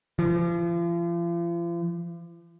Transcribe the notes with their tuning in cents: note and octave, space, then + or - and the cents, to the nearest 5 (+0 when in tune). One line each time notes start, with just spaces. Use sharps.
F3 -40